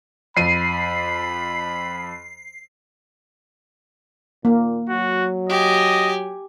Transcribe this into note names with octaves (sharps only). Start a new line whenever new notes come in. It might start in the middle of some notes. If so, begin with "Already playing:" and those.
F2 B5 C7 D#7
A#2 A#3
F#3 F#4
G4 D#5 G#5